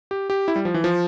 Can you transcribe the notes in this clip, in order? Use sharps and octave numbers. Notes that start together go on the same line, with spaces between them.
G4
G4
E4
G3
F3
E3
F3